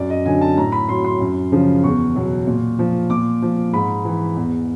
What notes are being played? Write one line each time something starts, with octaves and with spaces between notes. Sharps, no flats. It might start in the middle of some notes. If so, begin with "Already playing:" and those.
Already playing: F#2 D5
D#5
D3 F#3 G#5
A5
A2 A#5
B5
F#3 C6
C6
F#2
C#3 F3
E2 C#6
B2 F#3
A#2
F3
A#2 D6
F3
G#2 B5
E3
E2